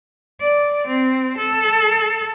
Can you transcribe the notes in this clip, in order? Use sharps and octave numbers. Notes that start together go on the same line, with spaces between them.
D5
C4
A4